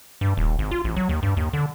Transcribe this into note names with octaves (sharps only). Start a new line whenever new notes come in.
G2
D#1
G#1
F4
A1
F#3
D#2
G2
D#2
D3